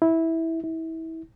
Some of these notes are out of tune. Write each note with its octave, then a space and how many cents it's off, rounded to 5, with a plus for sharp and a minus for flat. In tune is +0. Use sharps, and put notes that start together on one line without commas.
E4 -15
E4 -30